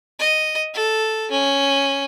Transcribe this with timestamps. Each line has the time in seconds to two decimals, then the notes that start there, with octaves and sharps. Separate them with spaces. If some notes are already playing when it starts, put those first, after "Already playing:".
0.19 D#5
0.74 A4
1.31 C#4